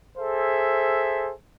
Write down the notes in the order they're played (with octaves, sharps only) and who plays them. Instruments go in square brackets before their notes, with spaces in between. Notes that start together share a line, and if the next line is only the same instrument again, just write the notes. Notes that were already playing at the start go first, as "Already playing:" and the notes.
[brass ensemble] G#4 A4 C5 E5